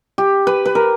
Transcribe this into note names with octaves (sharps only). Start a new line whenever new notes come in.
G4
B4
B4
A#4